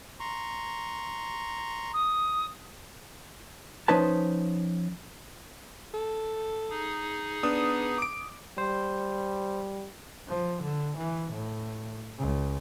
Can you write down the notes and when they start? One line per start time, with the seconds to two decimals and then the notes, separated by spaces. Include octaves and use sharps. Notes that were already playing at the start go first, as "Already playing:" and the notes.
0.20 A#5 C6 C#6
1.94 D#6
3.88 F3 C#4 D#4 B4 A5
5.94 A4
6.70 D#4 G#4
7.43 B3 D4 D#6
7.98 D6 D7
8.58 G3 C5
10.28 F3
10.62 D3
10.97 E3
11.32 A2
12.19 C#2